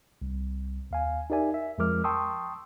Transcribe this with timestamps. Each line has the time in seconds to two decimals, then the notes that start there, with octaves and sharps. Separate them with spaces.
0.22 C2
0.91 D#2 F5 G#5
1.30 D#4 G4 A#4 D5 E5 G#5
1.54 E5
1.78 F2 F3 G#3 A#4 D6 F6
2.04 G5 A5 C6 C#6 D#6 E6